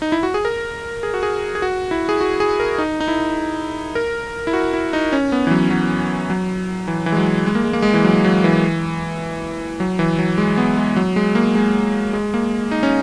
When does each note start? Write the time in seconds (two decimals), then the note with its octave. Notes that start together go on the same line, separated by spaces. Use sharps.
0.02 D#4
0.12 E4
0.23 F#4
0.34 G#4
0.45 A#4
1.03 G#4
1.14 F#4
1.23 G#4
1.55 G#4
1.62 F#4
1.91 E4
2.09 G#4
2.21 F#4
2.40 G#4
2.60 A#4
2.78 D#4
3.00 D#4
3.08 E4
3.95 A#4
4.47 E4
4.53 F#4
4.73 E4
4.93 D#4
5.13 C#4
5.32 B3
5.47 E3
5.51 F#3
5.70 F#3
6.30 F#3
6.88 E3
7.06 E3
7.12 G#3
7.17 F#3
7.46 G#3
7.55 A#3
7.64 G#3
7.73 A#3
7.82 G#3
7.94 E3
8.04 F#3
8.25 F#3
8.44 E3
9.80 F#3
9.99 E3
10.19 F#3
10.38 G#3
10.58 B3
10.77 G#3
10.96 F#3
11.16 G#3
11.35 A#3
11.55 G#3
12.13 G#3
12.34 A#3
12.71 D#4
12.83 C#4